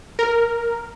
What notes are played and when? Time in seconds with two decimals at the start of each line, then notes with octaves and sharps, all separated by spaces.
0.19 A#4